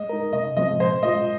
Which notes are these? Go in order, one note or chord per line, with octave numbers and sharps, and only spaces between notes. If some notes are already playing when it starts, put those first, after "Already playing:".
Already playing: G#3 D#5
D#4 A#4
C3 D#5
F3 G#3 C4 D#5
A#2 C5
G#3 F4 D#5